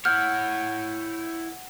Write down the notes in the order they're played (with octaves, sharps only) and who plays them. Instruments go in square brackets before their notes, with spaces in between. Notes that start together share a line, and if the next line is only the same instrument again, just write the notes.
[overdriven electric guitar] E4 C#5 [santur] F#5 [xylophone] F6 [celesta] G6